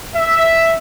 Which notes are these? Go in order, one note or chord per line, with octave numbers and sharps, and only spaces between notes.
E5